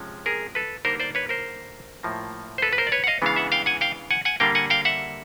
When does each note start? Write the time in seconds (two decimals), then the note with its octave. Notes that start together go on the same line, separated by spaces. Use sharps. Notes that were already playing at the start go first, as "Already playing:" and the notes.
Already playing: C3 F3 G#3 C#4
0.26 G#4 A#4
0.55 A4 B4
0.85 D3 G3 A#3 D#4 A#4 C5
1.00 C5 D5
1.15 B4 C#5
1.29 A#4 C5
2.03 A2 F3 A#3
2.58 C5
2.62 A4 B4
2.73 B4
2.78 A#4 C5
2.87 D5
2.92 B4 C#5
3.04 F#5
3.07 D#5 F5
3.22 C#3 E3 G#3 B3 D4 F5
3.36 E5 F#5
3.52 F5 G5
3.66 F#5 G#5
3.81 F5 G5
4.11 F#5 G#5
4.25 F#5 G#5
4.40 D3 G3 A#3 D4 F5 G5
4.55 F#5 G#5
4.70 F5 G5
4.85 E5 F#5